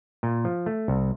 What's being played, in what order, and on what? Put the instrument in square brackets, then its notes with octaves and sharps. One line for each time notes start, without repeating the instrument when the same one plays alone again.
[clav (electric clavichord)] A#2
F3
A3
C2